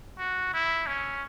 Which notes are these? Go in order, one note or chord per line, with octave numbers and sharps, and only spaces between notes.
F#4
E4
C#4